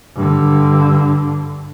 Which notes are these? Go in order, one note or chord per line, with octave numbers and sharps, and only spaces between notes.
G2 D3